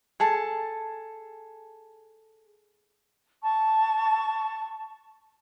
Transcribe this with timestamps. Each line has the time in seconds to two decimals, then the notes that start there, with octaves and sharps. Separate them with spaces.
0.20 G#4 A4 A5
3.43 A5 C#6